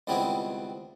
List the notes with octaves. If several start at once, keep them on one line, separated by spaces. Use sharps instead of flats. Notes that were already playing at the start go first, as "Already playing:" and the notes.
C#2 D#3 G3 B3 C4 E4